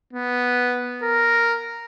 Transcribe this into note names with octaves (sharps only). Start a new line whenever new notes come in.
B3
A#4